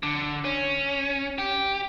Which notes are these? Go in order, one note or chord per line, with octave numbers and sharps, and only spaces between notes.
D3
C#4
G4